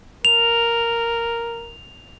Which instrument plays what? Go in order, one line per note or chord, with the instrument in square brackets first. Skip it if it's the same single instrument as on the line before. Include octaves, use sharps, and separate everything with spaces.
[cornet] A#4 [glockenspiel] F7